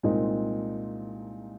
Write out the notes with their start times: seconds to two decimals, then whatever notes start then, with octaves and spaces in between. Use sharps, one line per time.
0.03 C2 A#2 G#3 C4 D#4